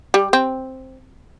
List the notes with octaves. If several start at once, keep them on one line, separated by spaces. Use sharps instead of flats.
G3
C4